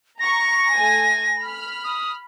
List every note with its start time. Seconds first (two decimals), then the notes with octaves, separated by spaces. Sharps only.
0.19 A#5 C#6 A#6
0.74 A3 G#5
1.42 B5 F6
1.84 D#6